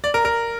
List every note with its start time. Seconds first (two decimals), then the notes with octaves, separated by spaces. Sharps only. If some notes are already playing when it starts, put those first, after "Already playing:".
0.04 D5
0.14 A#4
0.25 A#4